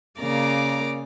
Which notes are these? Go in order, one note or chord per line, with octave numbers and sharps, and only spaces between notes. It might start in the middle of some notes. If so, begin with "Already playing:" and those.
C#3 A#3 D5 A#5 D6